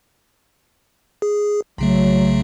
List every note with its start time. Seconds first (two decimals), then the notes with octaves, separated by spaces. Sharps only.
1.22 G#4
1.78 B1 C#3 F#3 A3